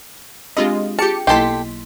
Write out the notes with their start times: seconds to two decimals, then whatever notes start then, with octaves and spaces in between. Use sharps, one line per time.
0.57 G#3 C4 D4 F4 G4 D#5
0.99 F4 G4 G#4 A5 C#7
1.27 B1 A#3 E4 G4 A4 D#5 C6 B6